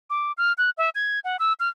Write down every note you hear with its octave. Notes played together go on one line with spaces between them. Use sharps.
D6
F6
F#6
E5
G#6
F#5
E6
F6